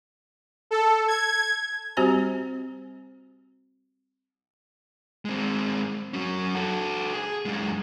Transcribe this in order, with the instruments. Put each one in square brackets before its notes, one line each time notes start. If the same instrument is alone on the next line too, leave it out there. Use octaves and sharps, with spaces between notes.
[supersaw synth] A4
G#6
[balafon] G3 C4 F#4 G4 C5 A#5
[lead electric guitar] G#3 C4
F#3 C#4
F#4 A4
G#4
F#2 G#3